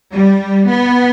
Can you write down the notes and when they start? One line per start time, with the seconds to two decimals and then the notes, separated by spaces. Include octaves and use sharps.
0.13 G3
0.68 B3